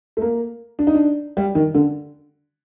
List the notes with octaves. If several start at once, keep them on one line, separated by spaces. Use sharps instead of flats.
A3
A#3
D4
D#4
D4
G3
D#3
D3